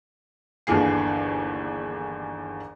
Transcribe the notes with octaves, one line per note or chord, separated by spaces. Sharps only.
G1 D#2 D3 E3 G#4 C7